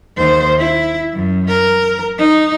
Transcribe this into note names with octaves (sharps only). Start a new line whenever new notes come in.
D#2 C5
E4
F#2
A#4
D#4